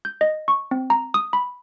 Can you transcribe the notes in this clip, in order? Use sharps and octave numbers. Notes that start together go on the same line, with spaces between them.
G6
D#5
C#6
C4
A#5
D#6
B5